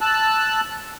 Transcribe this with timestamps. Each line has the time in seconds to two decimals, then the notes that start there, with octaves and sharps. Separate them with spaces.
0.01 A5 E6 F#6